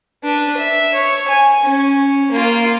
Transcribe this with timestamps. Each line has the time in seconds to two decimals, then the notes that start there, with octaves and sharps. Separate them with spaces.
0.24 D4 B4
0.57 E5
0.94 C#5
1.28 G#5
1.64 C#4
2.31 A#3 F4